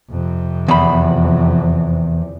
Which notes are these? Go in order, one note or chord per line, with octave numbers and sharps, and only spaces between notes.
F2 C3
E2 B5